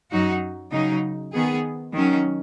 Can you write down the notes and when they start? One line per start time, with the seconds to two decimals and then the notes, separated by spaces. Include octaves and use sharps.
0.10 F#2 F#3 D#4 F#4
0.72 C#3 F#3 D#4
1.33 D#3 B3 G#4
1.93 D#3 F#3 C#4